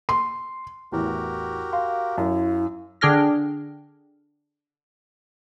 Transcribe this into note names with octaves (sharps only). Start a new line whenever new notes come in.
C6
A1 E2 F#4 G4 A#4
F5 C6
F#2 E4
D3 D4 G#4 G5 F6 A#6